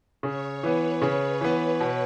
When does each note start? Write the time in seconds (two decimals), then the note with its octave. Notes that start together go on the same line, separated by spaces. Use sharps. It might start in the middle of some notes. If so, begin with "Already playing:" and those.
0.23 C#3 C#5
0.63 E3 B3 B4
1.02 C#3 C#5
1.41 E3 B3
1.80 B2